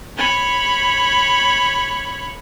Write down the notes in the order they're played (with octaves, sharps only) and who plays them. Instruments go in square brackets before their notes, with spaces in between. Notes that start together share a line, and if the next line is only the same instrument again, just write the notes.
[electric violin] C#5 B5